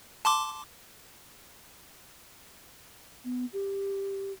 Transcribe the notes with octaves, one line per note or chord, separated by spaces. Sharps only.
A5 C6 D6
B3
G4